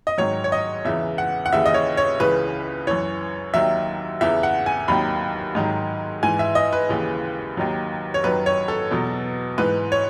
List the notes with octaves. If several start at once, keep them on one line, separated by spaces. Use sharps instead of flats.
D#5
G#2 D#3 F#3 C#5
C#5
D#5
E2 C#3 E3 E5
F#5
F#5
D#2 C#3 E3 E5
D#5
C#5
C#5
C#2 C#3 E3 B4
F#2 E3 C#5
D#2 D#3 F#3 E5
E2 C#3 E3 E5
F#5
G#5
D#2 D#3 F#3 B5
G#2 D#3 F#3
G#2 E3 G#5
E5
D#5
B4
D#2 C#3 E3
D#2 D#3 F#3
C#5
F#2 D#3 F#3 B4
C#5
A4
E2 B2 F#3
G#2 E3 B4
C#5